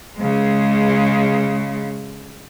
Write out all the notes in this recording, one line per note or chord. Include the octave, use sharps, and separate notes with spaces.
C#3 G#3